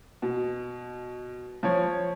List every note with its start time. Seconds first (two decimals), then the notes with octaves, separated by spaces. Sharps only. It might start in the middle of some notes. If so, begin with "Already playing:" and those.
0.22 B2
1.63 F3 C#5